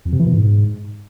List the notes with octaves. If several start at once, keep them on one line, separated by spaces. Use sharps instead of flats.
F2
C3
E3
B2
G#2